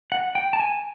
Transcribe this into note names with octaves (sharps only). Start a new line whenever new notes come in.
F#5
G5
A5
G#5